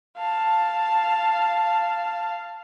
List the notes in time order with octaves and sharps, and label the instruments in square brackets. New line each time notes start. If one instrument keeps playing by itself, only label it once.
[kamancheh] F5 A5